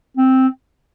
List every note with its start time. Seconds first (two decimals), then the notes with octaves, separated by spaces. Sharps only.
0.17 C4